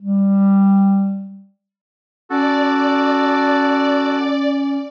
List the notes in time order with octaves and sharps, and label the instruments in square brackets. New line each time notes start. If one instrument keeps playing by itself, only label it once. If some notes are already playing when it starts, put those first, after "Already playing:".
[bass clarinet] G3
[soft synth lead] C#4 [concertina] F#4 A4 [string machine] D5